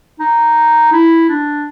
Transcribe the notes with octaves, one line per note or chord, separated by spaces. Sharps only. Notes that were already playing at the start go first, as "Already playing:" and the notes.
D#4
E4
D4